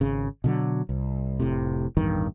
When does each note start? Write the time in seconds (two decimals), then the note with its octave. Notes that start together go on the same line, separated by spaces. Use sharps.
0.01 G#1 C#3
0.44 B2 D3 F#3
0.89 C2
1.40 F1 A2 C3
1.97 A1 E2 G2 D#3